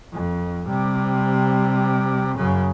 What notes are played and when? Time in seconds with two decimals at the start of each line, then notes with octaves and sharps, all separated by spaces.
0.12 F2
0.66 C3 G3
2.36 F#2 C#3